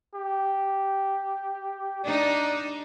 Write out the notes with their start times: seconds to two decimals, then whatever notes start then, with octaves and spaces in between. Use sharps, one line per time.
0.15 G4
2.04 D4 D#4 D5